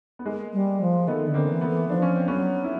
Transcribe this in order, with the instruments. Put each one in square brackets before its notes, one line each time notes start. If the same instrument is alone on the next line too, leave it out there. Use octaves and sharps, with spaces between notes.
[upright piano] B3
G#3 A#3
[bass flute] G3
F3
[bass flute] D#3 [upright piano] A3 B3
[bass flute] D3
[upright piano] A#3 C4
[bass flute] E3
[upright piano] A3 B3
[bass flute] E3
[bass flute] F3 [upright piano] D4
[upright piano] C#4
C4
[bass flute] F#3 [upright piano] B3 C#4
[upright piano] E4